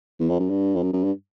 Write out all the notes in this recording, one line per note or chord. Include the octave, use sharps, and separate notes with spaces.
E2
F2
F#2
G2
F2
F#2
F#2
G2